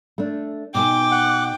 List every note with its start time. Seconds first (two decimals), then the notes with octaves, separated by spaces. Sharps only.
0.18 A3 D4
0.75 B2 D#4 G5 G#5 D6
1.11 F#5